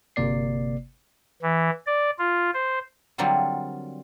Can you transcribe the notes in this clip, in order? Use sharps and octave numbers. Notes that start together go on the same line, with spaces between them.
G1 C3 A#3 D5 C7
E3
D5
F4
C5
D3 F#3 G3 A#3 C4 F4